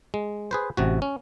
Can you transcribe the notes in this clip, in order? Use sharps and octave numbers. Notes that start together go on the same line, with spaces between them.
G#3
G#4 B4 C5
A1 C3 F#4
C#4